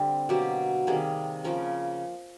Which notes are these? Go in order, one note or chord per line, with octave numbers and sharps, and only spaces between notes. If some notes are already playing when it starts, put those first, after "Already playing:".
Already playing: D3 G3 C4
B2 F#3 A#3 G4
C3 D#3 G3 A#3 G#4
C#3 F3 A#3 A#4